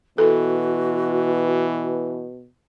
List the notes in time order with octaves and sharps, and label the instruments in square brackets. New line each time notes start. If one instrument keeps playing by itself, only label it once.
[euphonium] B2 [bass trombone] E3 [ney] F#4 [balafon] A4